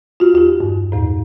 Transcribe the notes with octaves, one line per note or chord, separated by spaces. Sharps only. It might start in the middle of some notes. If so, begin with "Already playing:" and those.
F4 F#4
E2 F4 G4
G2
E2 A2